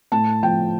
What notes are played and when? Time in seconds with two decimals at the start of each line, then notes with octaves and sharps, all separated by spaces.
0.12 A2 A5
0.43 F3 G5